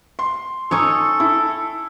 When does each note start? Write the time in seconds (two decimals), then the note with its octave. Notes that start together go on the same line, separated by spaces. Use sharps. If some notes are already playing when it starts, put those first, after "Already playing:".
0.19 C6
0.71 C#4 D#4 A4 C#5
1.20 E4